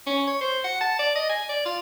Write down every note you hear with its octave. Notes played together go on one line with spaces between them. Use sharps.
C#4
C#5
C5
F#5
A5
D5
D#5
G#5
D5
F4